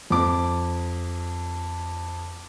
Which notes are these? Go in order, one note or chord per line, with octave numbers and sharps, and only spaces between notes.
F2 D6